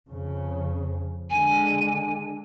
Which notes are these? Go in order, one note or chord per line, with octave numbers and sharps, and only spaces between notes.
F2 C#3
D3 G#3 G#5